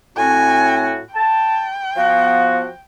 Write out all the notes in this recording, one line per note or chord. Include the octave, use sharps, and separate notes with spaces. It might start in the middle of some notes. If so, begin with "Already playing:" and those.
A2 C4 F#4 G#5
G5 A5
F3 B3 F#4 F5